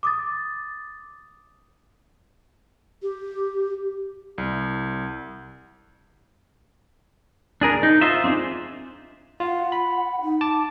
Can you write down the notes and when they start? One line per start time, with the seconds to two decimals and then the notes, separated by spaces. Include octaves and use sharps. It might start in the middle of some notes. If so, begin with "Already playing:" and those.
0.03 D6 D#6 A6
3.02 G4
4.38 C2
7.61 D4 G#4 A#4
7.83 D#4
8.01 F4 C5 D#5 E5
8.24 C4 D4 D#4 G#4
9.40 F4 F#5
9.72 B5
10.22 D#4
10.41 A5 D6